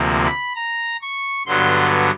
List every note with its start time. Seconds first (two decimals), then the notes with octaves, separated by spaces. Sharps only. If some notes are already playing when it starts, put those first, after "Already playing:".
Already playing: D2 C3 F3 A#3
0.25 B5
0.55 A#5
1.01 C#6
1.46 G2 D3 F#3 B3 C6